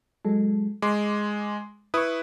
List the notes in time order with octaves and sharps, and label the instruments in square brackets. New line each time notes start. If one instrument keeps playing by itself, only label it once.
[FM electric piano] F#3 G#3 A4
[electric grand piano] G#3 [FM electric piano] C6 D6
[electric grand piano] E4 B4 [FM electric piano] C#6 D#6